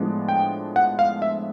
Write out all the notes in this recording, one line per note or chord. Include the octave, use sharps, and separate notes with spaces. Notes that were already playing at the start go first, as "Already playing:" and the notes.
Already playing: A2 F3 G#3 B3 D4
G5
F#5
F5
E5